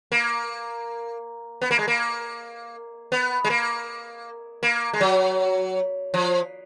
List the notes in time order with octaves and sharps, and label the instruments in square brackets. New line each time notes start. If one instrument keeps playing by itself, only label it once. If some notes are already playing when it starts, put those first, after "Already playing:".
[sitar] A#3
B3
A#3
G#3
A#3
B3
G#3
A#3
A#3
G#3
F#3
F3